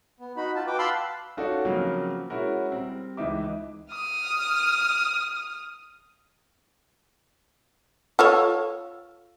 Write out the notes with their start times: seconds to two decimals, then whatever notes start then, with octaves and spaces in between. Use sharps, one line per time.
0.20 B3
0.37 D#4 F#4 B5
0.55 F4 A5
0.67 F#4 B4 G5 D6
0.79 F5 A5 B5 C6 E6 F#6
1.37 C#4 D#4 F4 F#4 A4 D5
1.65 C#3 F3 F#3 A#3 C4
2.30 G#3 C#4 E4 F#4 A#4
2.72 G3 C4
3.17 C#2 E3 D#4 E5 D6
3.92 D#6 F6
8.19 F4 A4 C#5